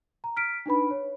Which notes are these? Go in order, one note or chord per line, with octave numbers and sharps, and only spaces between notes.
A#5
F6 B6 D7
D4 D#4 B4 B5
C#5